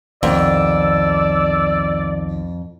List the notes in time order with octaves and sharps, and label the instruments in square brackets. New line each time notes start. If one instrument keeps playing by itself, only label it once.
[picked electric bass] C2 B2 D#3 [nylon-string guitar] F2 [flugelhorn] D5 [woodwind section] E6